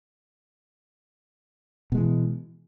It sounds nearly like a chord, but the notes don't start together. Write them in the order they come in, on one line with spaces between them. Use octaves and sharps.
B2 G#3 E3